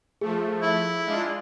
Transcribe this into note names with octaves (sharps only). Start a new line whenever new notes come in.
F3 A3 G#4
E4 E5
G#3 D4 F4